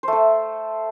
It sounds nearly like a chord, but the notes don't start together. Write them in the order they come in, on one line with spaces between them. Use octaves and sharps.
C5 A3 A4